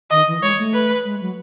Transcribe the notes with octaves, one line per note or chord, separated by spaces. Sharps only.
D#3 D#5
E3
G#3 C#5
A3
B4
G#3
F#3